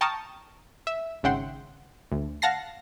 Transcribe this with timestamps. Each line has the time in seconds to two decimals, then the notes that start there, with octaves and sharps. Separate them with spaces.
0.01 G5 A5 A#5 C#6 D#6 F6
0.87 E5
1.23 G#1 C#3 E5 F#5 G5 C6
2.11 D2
2.42 F5 F#5 A5 A#6 C7